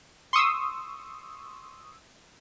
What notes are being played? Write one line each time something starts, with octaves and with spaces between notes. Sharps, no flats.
C6 C#6 D#6 E6